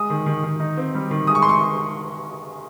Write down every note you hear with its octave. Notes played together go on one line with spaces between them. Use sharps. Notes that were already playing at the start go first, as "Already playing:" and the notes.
Already playing: G#3 D#6
D#3
D#3
D#3
D#4
C4
G3
D#3
G#3 D#6
C#6
C6
C#6